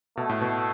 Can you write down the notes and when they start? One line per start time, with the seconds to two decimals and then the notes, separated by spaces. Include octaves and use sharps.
0.17 B2 A3
0.29 A2
0.41 B2